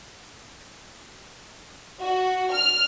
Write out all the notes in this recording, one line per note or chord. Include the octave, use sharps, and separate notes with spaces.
F#4
F6